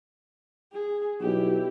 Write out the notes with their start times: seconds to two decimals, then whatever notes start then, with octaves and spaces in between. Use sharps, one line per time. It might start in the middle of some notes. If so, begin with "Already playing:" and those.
0.73 G#4
1.21 B1 E4 G4